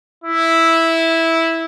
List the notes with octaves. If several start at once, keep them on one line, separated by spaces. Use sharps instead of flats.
E4